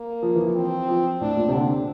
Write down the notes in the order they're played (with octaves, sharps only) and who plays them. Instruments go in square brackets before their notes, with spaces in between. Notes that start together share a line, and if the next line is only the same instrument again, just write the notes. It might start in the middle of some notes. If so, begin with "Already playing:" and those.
Already playing: [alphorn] A#3
[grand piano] F3
E3
F3
[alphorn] C4
[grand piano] F3
[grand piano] A2 [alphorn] D4
[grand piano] A#2
C3
[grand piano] D3 [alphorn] C4